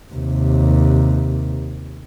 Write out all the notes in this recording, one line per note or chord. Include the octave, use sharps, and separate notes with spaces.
D#2 C3